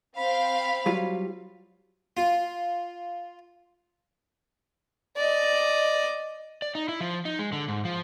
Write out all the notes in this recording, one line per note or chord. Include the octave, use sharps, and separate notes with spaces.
C4 F5 B5
F#3 G3 F4
F4
D5 D#5
D5
D#4
E4
F3
D#4
G#3
D3
G#2
F3